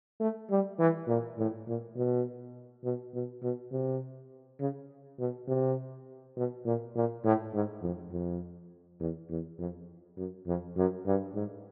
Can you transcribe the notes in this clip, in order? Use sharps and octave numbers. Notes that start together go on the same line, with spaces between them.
A3
G3
E3
A#2
A2
A#2
B2
B2
B2
B2
C3
C#3
B2
C3
B2
A#2
A#2
A2
G#2
F2
F2
E2
E2
F2
F#2
F2
F#2
G2
G#2